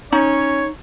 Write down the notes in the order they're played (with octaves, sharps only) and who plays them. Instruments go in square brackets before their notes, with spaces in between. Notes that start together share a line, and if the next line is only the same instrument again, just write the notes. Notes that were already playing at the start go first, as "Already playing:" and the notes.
[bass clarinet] C#4 [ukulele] D#4 [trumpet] C#5